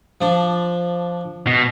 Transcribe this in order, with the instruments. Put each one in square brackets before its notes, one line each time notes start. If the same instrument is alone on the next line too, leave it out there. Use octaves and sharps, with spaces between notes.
[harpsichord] F3 D4
[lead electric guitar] B2